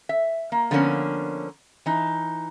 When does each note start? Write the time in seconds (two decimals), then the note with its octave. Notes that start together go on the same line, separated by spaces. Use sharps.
0.09 E5
0.52 A#3
0.71 D3 F3 A#3 B3 C#4
1.86 E3 D#4